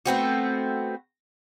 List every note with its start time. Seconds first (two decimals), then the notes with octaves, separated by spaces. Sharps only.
0.06 A3 B3 C4 F#4